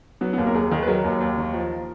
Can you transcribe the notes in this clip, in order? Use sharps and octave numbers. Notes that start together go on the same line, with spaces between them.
F#3 B3
B3
D#2 A#3
A#4
D#2 G#4
D#3 G#4
B4
F#3 A#4
D#2
D#2
D#3
F3